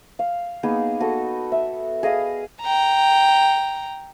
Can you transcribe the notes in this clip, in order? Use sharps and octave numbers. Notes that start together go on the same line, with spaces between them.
F5
A#3 B3 D#4 G#4
F#4 A4 D#5
E5
G#4 D#5 F5 D#6
G5 A#5